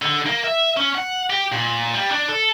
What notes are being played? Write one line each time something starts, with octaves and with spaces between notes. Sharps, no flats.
D3
A#3
E5
C#4
F#5
G4
A#2
G3
D4
A4